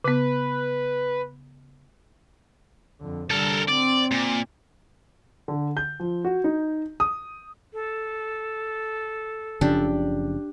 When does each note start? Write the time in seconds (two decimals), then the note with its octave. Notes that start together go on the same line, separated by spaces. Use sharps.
0.04 C#3 B3 B4
3.01 F2 D3
3.31 D3 G3 A4 A#4
3.69 C4 D5
4.12 A#2
5.48 D3
5.77 G6
6.00 F3
6.25 F#4
6.44 D#4
7.00 D#6
7.73 A4
9.61 F#1 C#3 F3 D4 G4